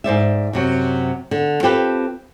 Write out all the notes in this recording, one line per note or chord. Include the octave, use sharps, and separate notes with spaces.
G#2 C5 D5 E5
F#2 C3 F#3
D3
C4 F4 G4 A4 B4